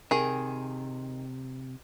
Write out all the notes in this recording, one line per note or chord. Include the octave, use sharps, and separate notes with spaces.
C3 D#3 G#4